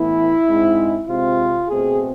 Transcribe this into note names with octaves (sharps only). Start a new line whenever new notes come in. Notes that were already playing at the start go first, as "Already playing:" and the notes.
Already playing: A2 E3 B3 E4
G#2 G#3 C4
C3 G#3 C4 F4
B2 A3 C4 G#4